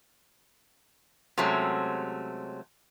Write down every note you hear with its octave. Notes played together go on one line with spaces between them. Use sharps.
C3 F#3 G#3 A3 C4 C#4